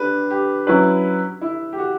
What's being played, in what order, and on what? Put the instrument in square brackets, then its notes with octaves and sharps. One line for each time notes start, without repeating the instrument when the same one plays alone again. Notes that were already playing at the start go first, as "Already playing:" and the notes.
Already playing: [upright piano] D4 G4 B4
G4
[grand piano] F#3 C#4 E4 B4
[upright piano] E4
G4
F#4